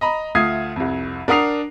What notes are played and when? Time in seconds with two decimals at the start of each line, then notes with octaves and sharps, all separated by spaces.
0.01 D#5 A#5 B5
0.35 D2 A3 F4 D#6 G#6 C7
0.76 C2 F2
1.28 D4 A#4 F#5 D#6 C7 F7